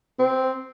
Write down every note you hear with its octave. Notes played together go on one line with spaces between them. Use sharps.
C4